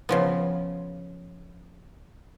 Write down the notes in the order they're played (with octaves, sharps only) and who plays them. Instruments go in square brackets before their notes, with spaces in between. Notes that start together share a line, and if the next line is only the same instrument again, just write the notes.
[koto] C#3 F3 B3